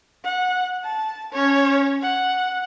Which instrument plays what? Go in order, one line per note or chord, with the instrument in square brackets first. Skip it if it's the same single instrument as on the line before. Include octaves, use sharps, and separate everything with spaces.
[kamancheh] F#5
A5
C#4 C#5
F#5